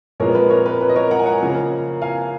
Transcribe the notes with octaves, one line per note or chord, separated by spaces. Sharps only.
A#2 F3 G#3 B3 A#4 C#5
B4
A#4 C#5
B4
B4
D#5
A#4 C#5
F#5 A#5
G#5
F#5 A#5
C#3 F3 A#3 C#4
F5 G#5